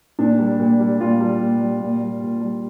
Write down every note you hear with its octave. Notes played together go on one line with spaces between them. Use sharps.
A#2 D4
G3
A#2
G3
A#2 F4
G3
A#2
G3
A#2
G3
A#2
G3